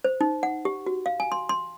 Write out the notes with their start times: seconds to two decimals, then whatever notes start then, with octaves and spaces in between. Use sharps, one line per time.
0.04 C5
0.21 D#4
0.43 F#5
0.65 G4
0.86 F#4
1.06 F5
1.20 G#5
1.32 C6
1.49 C6